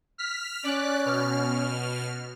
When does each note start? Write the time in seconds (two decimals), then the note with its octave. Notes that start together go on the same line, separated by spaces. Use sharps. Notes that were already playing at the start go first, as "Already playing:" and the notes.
0.18 F6 B6
0.64 C#4 D5 F#6
1.05 B2 F6